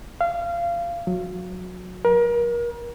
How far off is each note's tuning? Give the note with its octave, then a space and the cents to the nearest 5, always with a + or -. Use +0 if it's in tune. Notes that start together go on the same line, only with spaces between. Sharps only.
F5 -25
F#3 -25
A#4 +35